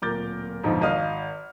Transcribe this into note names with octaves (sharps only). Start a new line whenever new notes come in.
D1 A#2 A#4 D6 G6 A6
F2 G#2 B2 D3 F3 D#4
G#1 D#5 F5 D#6 F6